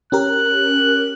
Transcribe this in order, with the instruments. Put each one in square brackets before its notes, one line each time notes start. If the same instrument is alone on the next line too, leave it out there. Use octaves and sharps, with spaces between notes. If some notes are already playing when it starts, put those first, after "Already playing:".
[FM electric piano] C#4 G4 A#4 [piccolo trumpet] F#6